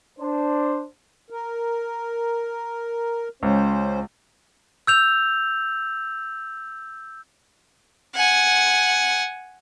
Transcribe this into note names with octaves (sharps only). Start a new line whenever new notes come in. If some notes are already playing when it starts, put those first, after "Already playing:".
D4 C5
A#4
C#2 C#4 C5
E6 G6 F7
F#5 G#5